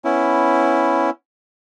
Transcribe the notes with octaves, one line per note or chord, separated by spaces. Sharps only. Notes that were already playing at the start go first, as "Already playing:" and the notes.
B3 C#4 E4